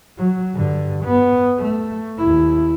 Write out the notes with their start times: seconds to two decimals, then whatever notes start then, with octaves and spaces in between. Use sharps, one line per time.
0.18 F#3
0.54 G2 D3
1.04 B3
1.59 A3
2.18 D#2 E4